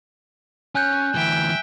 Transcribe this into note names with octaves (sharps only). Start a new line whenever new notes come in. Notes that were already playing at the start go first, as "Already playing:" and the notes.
C#4 G#5 F#6 G6
D2 E3 E5 G5